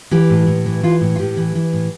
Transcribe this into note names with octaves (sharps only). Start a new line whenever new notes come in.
E3 G4
A2
A2
E3
E3 F4
A2
F4
A2 G4
E3
E3
A2